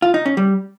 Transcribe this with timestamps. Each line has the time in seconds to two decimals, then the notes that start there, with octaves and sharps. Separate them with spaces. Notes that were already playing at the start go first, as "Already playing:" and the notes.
0.02 F4
0.14 D#4
0.26 C#4
0.37 G3